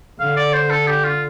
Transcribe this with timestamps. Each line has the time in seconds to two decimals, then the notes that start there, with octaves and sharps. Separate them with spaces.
0.19 D3 F5
0.36 D5
0.53 C5
0.70 A4
0.87 G4
1.04 F4